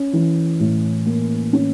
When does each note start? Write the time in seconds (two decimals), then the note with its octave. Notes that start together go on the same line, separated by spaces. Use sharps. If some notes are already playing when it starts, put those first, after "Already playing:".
Already playing: C#4
0.13 E3
0.60 A2
1.06 A#3
1.53 C#4